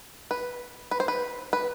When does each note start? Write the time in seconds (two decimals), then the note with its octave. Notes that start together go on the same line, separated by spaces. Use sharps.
0.31 B4
0.91 B4
1.00 C5
1.08 B4
1.53 B4